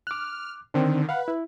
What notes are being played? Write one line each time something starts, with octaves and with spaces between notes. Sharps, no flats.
D6 F6 F#6
D3 D#3 C4 D4
B4 F5 F#5
E4